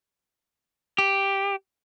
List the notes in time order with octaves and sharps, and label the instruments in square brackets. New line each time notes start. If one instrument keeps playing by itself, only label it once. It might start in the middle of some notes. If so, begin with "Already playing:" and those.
[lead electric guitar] G4